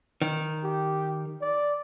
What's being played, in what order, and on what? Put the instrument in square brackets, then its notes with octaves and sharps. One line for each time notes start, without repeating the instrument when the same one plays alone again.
[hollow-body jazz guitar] D#3
[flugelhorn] G4
D5